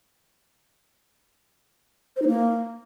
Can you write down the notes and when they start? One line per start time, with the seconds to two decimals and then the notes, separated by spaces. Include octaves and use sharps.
2.16 C5
2.22 D#4
2.27 A#3